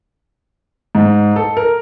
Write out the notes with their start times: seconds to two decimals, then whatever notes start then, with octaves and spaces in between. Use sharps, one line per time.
0.95 G#2
1.36 A4
1.57 A#4